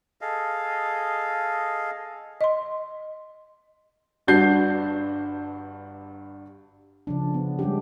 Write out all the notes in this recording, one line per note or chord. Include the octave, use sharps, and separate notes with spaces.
G#4 A4 D#5 F5
D#5 C6
G1 G2 D4 F#4 G6 C7
C#3 F3 D4
B3
G3 G#3 C#4 D4 G4